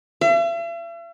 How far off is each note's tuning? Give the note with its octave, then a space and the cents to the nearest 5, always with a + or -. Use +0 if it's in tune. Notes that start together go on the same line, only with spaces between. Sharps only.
E5 +45